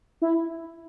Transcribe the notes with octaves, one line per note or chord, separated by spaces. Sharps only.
E4